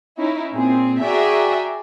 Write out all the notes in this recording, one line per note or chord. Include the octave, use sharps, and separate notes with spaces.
C#4 D#4 E4
A#2 C4 G#4
F#4 G#4 D5 E5 G5 A#5